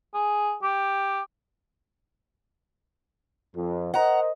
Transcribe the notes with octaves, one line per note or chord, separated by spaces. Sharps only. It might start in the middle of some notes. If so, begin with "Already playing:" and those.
G#4
G4
F2 F3
A#4 C5 D#5 F#5 A#5